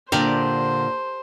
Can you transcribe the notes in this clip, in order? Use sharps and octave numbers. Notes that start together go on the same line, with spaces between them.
A#2 D3 G4 A#4 C5 D5